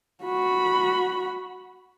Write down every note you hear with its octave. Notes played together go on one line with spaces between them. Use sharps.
F#4 B5